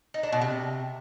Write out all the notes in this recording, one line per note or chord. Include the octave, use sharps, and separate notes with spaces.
D#4
D4
B2
C3